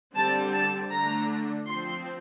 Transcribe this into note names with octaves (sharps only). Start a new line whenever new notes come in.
D3 G3 C4 A5
A5
D3 A3 D4 A#5
F3 C4 C6